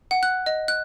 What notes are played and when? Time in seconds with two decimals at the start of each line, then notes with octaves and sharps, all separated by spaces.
0.11 F#5
0.23 F#6
0.46 D#5
0.68 F#6